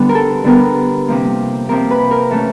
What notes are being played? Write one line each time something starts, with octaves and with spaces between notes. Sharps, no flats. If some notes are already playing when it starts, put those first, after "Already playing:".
Already playing: D3 G3 B3
A#4
A4
D3 G3 B3 A#4
C3 F3 A#3
C3 F3 A#3 A#4
B4
A#4
E3 A3 C#4 A4